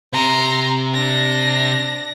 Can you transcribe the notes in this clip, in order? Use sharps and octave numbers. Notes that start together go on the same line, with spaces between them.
C3 A#5 C6
D4 A#6